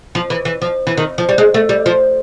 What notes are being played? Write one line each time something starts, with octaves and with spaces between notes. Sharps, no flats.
F3
E3
E3
F3
E3
D#3
F3
G3
G#3
A3
G3
F3